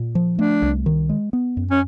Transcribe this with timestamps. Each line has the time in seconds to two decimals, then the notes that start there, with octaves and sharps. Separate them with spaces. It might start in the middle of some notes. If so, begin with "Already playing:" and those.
Already playing: A#2
0.15 F3
0.38 A3 D4
0.62 C2
0.86 D#3
1.09 G#3
1.33 B3
1.57 F#2
1.71 C#4